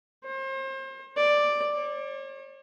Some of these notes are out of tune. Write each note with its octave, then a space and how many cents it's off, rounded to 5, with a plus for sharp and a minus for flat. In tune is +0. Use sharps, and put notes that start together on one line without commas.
C5 +35
D5 +5
C#5 -40